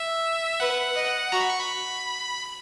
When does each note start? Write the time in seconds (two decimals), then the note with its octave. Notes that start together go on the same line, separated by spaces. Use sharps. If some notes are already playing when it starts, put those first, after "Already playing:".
Already playing: E5
0.60 B4 F#5
0.96 D#5
1.32 F#4 A#5
1.41 B5
1.50 C#6
1.59 B5